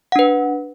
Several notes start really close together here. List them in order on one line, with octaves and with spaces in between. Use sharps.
F#5 D4 B4